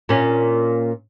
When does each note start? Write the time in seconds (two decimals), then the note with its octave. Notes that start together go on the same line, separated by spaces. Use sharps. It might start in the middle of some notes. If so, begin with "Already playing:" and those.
0.09 A#2 C#4